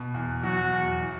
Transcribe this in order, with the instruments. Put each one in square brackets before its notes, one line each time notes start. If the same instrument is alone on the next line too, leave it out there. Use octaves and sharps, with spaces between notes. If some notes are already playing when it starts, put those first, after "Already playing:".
Already playing: [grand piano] B2
E2
[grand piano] F#3 [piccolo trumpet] F#4
[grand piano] E2
E3